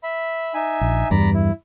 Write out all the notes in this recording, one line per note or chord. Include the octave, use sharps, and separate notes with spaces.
E5 B5
D#4 E5 G#5
A#1
E2 G2 D5 A#5 B5
E4